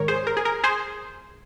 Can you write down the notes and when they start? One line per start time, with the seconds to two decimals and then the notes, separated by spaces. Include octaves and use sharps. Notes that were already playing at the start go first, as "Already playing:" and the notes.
Already playing: G#2 D#3 G#3 A#4 C#5
0.08 G#4 C5
0.27 A#4
0.37 G#4
0.45 A#4
0.64 G#4 C5